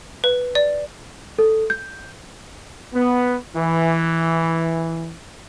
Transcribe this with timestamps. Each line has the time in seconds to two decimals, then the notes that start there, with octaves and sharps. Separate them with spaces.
0.24 B4
0.55 D5
1.39 A4
1.70 G6
2.94 B3
3.56 E3